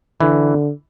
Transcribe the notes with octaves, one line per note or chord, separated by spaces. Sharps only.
D3 E3